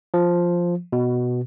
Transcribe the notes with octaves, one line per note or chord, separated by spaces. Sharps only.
F3
B2